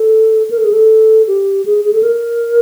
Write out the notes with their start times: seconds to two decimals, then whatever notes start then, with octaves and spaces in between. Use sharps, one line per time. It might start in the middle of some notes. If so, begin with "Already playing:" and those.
Already playing: A4
0.51 A#4
0.58 A4
0.65 G#4
0.73 A4
1.27 G4
1.66 G#4
1.85 G#4
1.93 A4
2.03 A#4